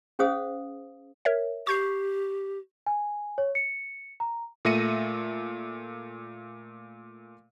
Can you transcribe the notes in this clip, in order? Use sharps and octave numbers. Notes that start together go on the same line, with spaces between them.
C#4 G#4 C5 F5 D#6
A#4 C#5 E5
G4 C#6 G6 C7
G#5
C#5
C#7
A#5
A#2 A3 E5 A#6 C#7 D#7